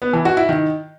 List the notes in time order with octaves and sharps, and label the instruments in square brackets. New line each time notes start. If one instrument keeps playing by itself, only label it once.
[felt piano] B3
E3
F#4
E4
D#3